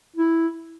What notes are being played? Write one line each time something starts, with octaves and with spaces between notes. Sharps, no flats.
E4